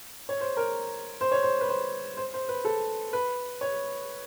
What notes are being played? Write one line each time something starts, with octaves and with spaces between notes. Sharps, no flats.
C#5
C5
A#4
C5
C#5
C5
B4
C5
C5
C5
B4
A4
B4
C#5